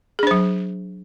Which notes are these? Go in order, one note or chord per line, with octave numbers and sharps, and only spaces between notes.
F#3 D4 G#4 C5